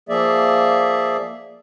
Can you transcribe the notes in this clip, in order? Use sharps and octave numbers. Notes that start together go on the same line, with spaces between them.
F3 A#3 G#4 D5 E5